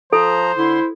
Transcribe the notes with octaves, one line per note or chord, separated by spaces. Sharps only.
F3 A4 C5 A#5
D3 E4 C6